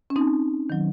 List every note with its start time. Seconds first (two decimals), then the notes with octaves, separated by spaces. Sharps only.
0.10 C#4
0.16 C4 D#4
0.70 D#3 F#3